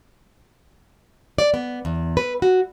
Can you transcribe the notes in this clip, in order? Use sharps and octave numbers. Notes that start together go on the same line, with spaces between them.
D5
B3
E2
B4
F#4